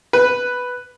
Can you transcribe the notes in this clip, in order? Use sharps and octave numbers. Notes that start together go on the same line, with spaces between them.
B4